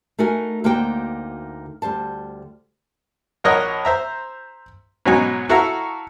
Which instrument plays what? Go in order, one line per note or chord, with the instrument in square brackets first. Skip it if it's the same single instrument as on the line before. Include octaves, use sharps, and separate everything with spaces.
[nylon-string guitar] A3 D#4 F#4 A#4 G#5
D2 A#3 D#4 F#4 C5 G5
D2 G3 C5 A5
[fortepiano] A#1 A#4 C#5 D#5 F#5
C5 E5 A#5
G#2 B2 F#3 C#4 D#4 G#5
E4 F#4 A4 E5 F5 A#5